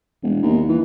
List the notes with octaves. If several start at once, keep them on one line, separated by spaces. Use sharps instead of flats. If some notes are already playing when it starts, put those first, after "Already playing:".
E1
D#2
E3